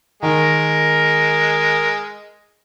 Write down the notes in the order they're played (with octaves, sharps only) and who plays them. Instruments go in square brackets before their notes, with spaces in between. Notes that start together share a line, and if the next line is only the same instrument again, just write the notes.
[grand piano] D#3 [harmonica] G#3 [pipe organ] A#4